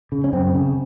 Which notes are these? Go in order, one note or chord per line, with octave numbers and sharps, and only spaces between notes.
C#3
C#4
F#2 C4
C#3